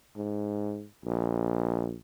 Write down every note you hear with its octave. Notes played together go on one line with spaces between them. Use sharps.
G#2
A#1